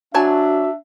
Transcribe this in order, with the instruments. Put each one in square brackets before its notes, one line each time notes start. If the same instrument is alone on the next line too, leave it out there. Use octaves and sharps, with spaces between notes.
[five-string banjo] F#3 G#5 A5 [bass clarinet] D4 [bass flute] F#4 [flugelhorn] E5